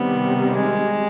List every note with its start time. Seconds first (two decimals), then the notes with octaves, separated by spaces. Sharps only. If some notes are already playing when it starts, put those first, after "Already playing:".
Already playing: C3 D#3 G3 B3
0.56 G#3